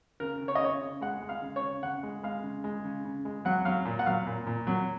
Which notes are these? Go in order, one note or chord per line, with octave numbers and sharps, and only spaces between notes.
C#3 A#4
C#3
C#5
D#5
C#3 C#5
C#3
G#3 F#5
G#3
F5
C#3
C#5
C#3
C#3 F#5
G#3
G#3 F5
C#3
G#3
C#3
C#3
G#3
F#3 F#5
F#3 F5
A#2
F#5
F#3 F5
A#2
A#2
F#3